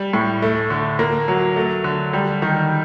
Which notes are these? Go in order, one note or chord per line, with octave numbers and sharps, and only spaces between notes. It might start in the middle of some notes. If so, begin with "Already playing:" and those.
Already playing: G3
A2
A3
D3
A#3
F#3
A3
D3
G3
D#3